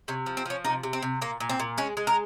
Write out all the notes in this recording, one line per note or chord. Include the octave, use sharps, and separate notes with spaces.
C3 C#4
F3
C4
F3 C#4
C3 D#4
C3
C4
C3
A#2 A#3
A#2
C4
A#2
G#3 C#4
G#3
A#4